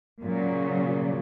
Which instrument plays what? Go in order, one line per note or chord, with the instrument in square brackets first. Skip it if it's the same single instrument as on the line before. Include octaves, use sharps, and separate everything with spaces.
[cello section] A#2 C#3 F#3